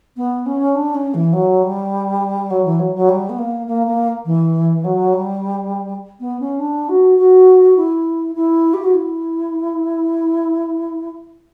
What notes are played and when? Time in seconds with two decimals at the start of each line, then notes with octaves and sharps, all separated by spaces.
0.16 B3
0.46 C#4
0.74 D4
0.94 C#4
1.13 E3
1.32 F#3
1.62 G3
2.50 F#3
2.64 E3
2.79 F#3
2.94 F#3
3.08 G3
3.29 B3
3.38 A#3
3.66 A#3
3.86 A#3
4.25 E3
4.84 F#3
5.12 G3
6.20 B3
6.40 C#4
6.59 D4
6.88 F#4
7.18 F#4
7.76 E4
8.35 E4
8.73 G4
8.83 F#4
8.93 E4